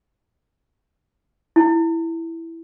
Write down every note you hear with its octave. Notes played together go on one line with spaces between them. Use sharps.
E4